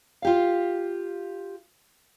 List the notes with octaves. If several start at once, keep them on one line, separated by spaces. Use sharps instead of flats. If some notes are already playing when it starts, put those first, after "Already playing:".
F4 G4 F5